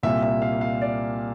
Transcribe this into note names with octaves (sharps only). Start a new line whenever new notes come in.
C2 A#2 G3 A#3 E5
E5
F5
F5
D5